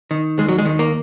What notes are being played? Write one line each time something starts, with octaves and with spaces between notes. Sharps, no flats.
D#3
D#2 G#3
F#3
G#3
D#3
A#3